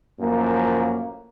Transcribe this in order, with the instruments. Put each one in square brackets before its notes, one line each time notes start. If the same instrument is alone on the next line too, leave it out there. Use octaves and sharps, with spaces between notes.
[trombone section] F#2 A2 F3 [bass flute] A#3